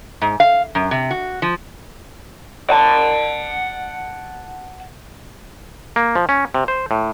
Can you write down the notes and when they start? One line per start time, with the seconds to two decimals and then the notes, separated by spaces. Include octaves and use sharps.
0.21 G#2
0.40 F5
0.75 F#2
0.91 C3
1.11 F#4
1.42 F3
2.70 F#5 A5
5.96 A#3
6.15 F3
6.29 C#4
6.54 C3
6.68 C5
6.91 A2